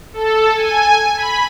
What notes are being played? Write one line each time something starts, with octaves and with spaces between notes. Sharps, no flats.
A4
G#5
B5